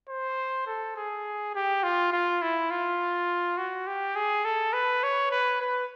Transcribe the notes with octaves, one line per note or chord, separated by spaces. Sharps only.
C5
A4
G#4
G4
F4
F4
E4
F4
F#4
G4
G#4
A4
B4
C#5
B4
B4